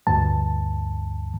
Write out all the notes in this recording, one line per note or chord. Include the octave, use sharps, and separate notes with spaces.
D2 G2 A5